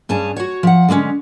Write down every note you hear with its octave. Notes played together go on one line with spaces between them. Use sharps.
G2 C#4 G#4 A5
F#4 C#5
F3 F#5
D3 G#3 A3 C#4